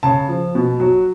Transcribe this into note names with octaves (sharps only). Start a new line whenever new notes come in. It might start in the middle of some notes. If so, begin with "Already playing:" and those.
C#3 A5
F3
B2
F#3